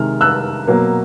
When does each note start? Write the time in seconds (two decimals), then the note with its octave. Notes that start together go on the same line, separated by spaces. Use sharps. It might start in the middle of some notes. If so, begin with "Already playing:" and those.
Already playing: C3 D#3 G#3 F6
0.21 E6 F#6
0.68 B2 F#3 A#3